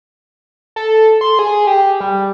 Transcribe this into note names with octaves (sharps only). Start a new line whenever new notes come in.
A4
C6
G#4
G4
G3